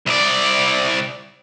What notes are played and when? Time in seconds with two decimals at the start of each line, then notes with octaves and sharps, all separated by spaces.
0.06 C2 D5